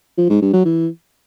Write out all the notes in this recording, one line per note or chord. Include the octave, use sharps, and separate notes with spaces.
F3
G#2
G2
F#3
E3